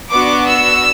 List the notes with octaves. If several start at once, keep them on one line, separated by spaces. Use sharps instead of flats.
B3 D4 F#4 D6
E6